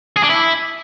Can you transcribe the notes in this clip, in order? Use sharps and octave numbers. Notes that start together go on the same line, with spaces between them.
G#4
D4
E4